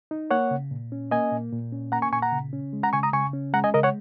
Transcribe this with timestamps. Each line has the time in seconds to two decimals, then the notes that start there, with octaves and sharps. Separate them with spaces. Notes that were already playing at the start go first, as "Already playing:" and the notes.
0.11 D#4
0.31 A#3 C#5 F#5
0.51 C#3
0.71 A#2
0.92 C#4
1.11 A#3 D#5 G#5
1.32 A#2
1.52 A#2
1.72 C#4
1.92 A#3 F#5 A#5
2.02 G#5 C#6
2.13 A#2 G#5 C#6
2.22 F#5 A#5
2.32 C#3
2.53 C#4
2.73 G#3
2.83 F#5 A#5
2.93 C#3 G#5 C#6
3.03 A#5 D#6
3.13 C#3 G#5 C#6
3.33 C#4
3.54 G#3 F#5 A#5
3.64 D#5 G#5
3.74 C#3 A#4 D#5
3.83 C#5 F#5